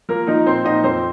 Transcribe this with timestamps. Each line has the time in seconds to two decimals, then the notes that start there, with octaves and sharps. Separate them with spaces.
0.09 F3 A#3 A#4
0.27 F3 D#4 D#5
0.46 A#2 C4 C5
0.64 A#2 D#4 D#5
0.83 F2 C4 C5